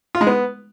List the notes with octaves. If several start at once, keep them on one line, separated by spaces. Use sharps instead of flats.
F4
G#3
B3